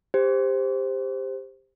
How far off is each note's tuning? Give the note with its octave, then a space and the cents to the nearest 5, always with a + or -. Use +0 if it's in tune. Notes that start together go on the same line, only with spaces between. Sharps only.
G4 +20 C5 +0